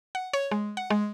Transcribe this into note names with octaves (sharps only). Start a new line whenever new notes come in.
F#5
C#5
G#3
F#5
G#3